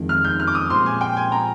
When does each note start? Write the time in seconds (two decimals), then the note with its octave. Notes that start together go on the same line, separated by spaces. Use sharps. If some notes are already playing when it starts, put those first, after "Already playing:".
Already playing: F2 D#3 G#3
0.09 F6
0.25 G6
0.40 F6
0.47 D6
0.55 D#6
0.70 A#2 F3 G#3 C4 G4 C6
0.86 G#5
1.01 G5
1.17 G#5
1.32 A#5